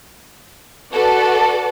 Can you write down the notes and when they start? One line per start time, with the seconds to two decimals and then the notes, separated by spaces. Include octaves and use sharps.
0.92 F#4 A4 B4 D5